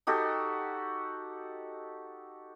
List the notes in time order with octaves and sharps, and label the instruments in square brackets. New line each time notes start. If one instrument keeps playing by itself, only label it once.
[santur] D#4 F#4 G4 A4